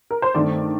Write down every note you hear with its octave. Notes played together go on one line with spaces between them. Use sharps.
A#4
C5
G2 D#3 A3 C4 D5